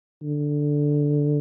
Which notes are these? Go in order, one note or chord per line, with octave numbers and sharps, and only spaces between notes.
D3